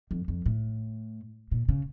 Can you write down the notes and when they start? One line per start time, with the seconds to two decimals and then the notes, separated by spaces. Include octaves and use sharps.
0.11 F2
0.28 F2
0.46 A2
1.52 A#2
1.69 C#3